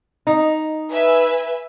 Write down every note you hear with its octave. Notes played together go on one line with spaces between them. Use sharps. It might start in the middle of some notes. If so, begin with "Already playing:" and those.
D#4
B4 E5 G#5